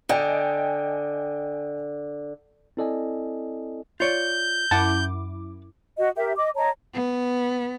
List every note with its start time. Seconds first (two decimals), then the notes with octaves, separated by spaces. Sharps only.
0.09 D3 D#5 G5 G#5
2.77 C4 E4 A4 D5 D#5 G#5
4.00 F4 C#5 D5 G6
4.71 F#2 E4 F#5 A5 D6
5.97 F#4 D#5
6.15 G4 A#4 E5
6.36 D#5 D6
6.57 C#5 D#5 A5 A#5
6.94 B3